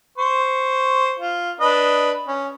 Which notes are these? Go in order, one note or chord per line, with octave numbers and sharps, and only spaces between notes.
C5 C#6
F4
D4 B4 D#5
C#4